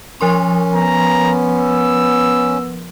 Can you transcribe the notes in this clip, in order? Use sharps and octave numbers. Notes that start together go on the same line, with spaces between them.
F3 C#4 A#4 C6
B3 A#5
E6